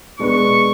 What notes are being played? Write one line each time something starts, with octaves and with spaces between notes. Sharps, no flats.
B2 G#3 D4 G#4 B4 C#6